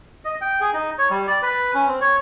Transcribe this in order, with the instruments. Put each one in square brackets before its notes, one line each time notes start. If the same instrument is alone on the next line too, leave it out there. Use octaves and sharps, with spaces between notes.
[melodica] D#5
G5
G#4
D#4
C#5
G3
D5
B4
C#4
C4
C#5